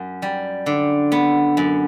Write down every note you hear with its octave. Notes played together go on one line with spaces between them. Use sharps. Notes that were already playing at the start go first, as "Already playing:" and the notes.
Already playing: F#2
G3
D3
B3
F#2